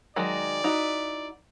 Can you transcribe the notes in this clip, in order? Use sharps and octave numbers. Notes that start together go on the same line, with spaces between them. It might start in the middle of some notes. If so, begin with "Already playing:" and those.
D#3 F#3 G#3 D5
D#4 E4 F#4